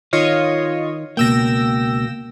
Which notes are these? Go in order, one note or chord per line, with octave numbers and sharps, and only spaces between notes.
D#3 F4 C#5 D#5
C#2 B2 A#3 G5 E6 A#6